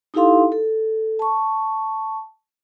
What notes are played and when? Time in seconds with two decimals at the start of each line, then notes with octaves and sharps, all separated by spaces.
0.14 D#4 E4 G4 A4 F5 C6
0.52 A4
1.19 A5 C#6